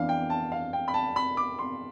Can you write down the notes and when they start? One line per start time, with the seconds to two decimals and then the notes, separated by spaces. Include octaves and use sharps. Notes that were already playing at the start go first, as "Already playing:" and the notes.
Already playing: F2 E3 B3 D4 F5
0.09 G5
0.30 A5
0.52 F5
0.73 G5
0.88 B5
0.94 A5
1.16 B5
1.37 D6
1.59 C6